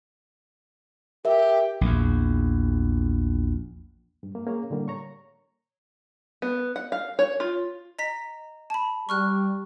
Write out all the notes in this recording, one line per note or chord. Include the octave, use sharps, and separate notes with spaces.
G4 A#4 E5
A#1 E2
G2
A#3
A#3 C#4 G#4 C#5
A2 D3 G3 A#3
C#5 A#5 C#6
B3
F#5
F5
C#5
F4
D#5 A#5 B6
A5 B5
G3 C#6 F6 F#6